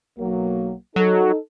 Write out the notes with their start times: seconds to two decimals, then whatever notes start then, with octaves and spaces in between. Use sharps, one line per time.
0.18 B1 F#3 A#3
0.96 F#3 D#4 A4